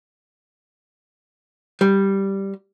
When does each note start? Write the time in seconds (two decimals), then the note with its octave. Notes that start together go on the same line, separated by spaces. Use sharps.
1.81 G3